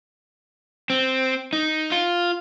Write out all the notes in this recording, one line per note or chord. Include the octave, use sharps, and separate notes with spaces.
C4
D#4
F4